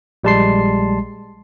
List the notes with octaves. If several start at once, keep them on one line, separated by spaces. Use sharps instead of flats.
A#1 G3 G#3 A5 C6 C7